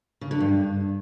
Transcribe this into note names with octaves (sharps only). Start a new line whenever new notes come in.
C#3
D3
G2